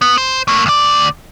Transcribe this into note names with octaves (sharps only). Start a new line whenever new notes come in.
B3
C5
A3 A#3
D2 D5